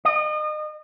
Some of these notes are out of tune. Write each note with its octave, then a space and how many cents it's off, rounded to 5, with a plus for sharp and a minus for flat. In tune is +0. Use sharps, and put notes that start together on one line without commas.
D#5 -35